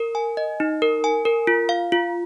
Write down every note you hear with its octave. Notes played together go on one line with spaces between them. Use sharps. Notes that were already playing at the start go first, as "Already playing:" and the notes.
Already playing: A#4
G#5
D#5
D#4
A#4
G#5
A#4
F4
F5
F4